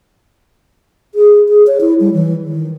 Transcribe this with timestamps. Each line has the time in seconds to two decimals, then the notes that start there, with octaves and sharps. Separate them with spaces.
1.15 G#4
1.49 G#4
1.67 C#5
1.81 E4
2.00 G3
2.14 E3
2.44 D#3